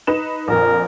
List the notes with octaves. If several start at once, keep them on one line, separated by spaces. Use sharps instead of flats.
D#4 B4 E7
A#1 F2 A#4